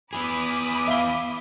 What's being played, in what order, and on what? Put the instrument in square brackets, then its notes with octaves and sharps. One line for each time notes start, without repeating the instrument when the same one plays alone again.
[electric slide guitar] B3 E4 G#4 [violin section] B5 D6 D#6
[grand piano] E5 F5 G7